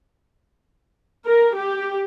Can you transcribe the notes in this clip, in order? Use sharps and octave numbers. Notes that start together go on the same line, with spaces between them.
A#4
G4